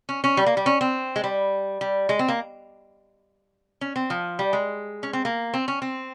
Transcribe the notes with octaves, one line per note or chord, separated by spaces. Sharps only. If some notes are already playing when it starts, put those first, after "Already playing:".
C#4
C#4
G3
A#3
G3
C#4
C4
G#3
G3
G3
G#3
C4
A#3
C#4
C4
F3
G3
G#3
C#4
C4
A#3
C4
C#4
C4